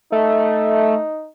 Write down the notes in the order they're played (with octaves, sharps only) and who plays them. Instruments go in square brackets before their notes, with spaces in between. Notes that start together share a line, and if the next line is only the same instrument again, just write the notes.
[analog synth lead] A3 [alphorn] D#4